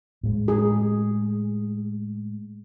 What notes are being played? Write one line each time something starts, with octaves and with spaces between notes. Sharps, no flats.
A2 G#3
G#4